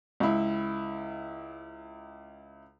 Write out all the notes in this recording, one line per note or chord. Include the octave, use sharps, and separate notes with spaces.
C#2 E4